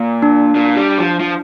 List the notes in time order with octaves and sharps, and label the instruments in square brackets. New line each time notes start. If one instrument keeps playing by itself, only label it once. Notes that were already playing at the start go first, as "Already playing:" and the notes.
Already playing: [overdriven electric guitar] A#2
[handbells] D4
[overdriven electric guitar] A#2
G3
F3
F3